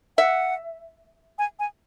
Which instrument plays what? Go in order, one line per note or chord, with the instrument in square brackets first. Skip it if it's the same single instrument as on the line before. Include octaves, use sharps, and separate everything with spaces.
[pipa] E5 [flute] F#5
[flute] G#5
G#5